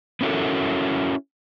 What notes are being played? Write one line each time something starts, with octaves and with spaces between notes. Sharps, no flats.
B3 C#4 E4 F#4 A4 A#4